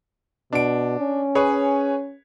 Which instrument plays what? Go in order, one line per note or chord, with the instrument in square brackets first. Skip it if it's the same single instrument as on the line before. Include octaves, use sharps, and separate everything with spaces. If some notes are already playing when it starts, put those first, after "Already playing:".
[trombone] B2 [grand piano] D4 D7
[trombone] C#4
[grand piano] G#4 B4 C#5